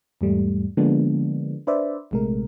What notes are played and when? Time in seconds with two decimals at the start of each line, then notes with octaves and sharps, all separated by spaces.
0.21 E2 G#2 G3 A3
0.77 D3 F3 G#3 A#3 B3 D4
1.67 D4 B4 C5 D5 E5
2.11 A#1 C3 G#3 A3 A#4